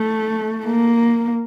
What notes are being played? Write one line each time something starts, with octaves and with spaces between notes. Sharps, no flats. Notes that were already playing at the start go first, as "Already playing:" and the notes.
Already playing: A3
A#3